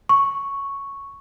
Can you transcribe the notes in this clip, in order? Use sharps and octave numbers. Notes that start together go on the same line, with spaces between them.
C#6